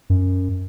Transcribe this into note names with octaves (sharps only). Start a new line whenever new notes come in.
F#2